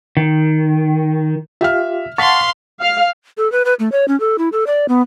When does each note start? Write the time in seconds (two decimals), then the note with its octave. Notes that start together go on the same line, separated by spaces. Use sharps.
0.17 D#3
1.61 F4 G4 E5 F5 F6
2.18 F5 F#5 A5 C6 C#6 A6 B6
2.81 F5
3.37 A4
3.52 B4
3.65 B4
3.79 A3
3.92 C#5
4.08 C#4
4.20 A4
4.38 E4
4.52 A4
4.67 D5
4.88 B3